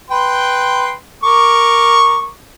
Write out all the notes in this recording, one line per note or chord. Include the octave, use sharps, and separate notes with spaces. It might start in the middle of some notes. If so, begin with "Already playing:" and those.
B4 G5 C6
A#4 C#6 D6